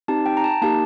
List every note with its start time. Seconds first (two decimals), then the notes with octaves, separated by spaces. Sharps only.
0.08 C4 D#4 G4 A5
0.26 G5
0.37 A#5
0.44 A5
0.62 A#3 D#4 G4 A5